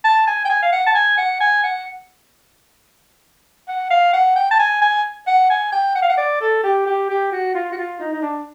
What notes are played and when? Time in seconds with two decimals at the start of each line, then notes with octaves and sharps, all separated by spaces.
0.04 A5
0.27 G#5
0.45 G5
0.49 G#5
0.62 F5
0.72 F#5
0.86 A5
0.95 G#5
1.18 F#5
1.40 G#5
1.63 F#5
3.68 F#5
3.90 F5
4.13 F#5
4.36 G5
4.50 A5
4.59 G#5
4.81 G#5
5.27 F#5
5.50 G#5
5.72 G5
5.95 F#5
6.02 F5
6.09 F#5
6.17 D5
6.40 A4
6.63 G4
6.86 G4
7.09 G4
7.32 F#4
7.54 F4
7.72 F#4
7.77 F4
8.00 D#4
8.13 D#4
8.22 D4